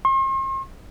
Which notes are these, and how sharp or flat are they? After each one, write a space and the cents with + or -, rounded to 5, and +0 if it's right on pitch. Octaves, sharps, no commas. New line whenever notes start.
C6 +45